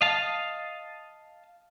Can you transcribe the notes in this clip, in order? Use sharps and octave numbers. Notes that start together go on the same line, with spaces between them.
D#5 F5 A5